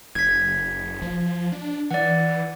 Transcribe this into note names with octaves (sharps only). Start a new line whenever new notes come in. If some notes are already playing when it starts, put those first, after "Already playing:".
F#1 G#6 B6
F3
D4
E3 D5 F#5